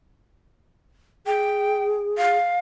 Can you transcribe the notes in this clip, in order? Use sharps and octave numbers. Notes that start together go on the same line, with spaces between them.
G#4 G5
F5